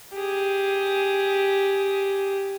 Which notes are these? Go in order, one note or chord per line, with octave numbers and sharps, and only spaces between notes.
G4 G#4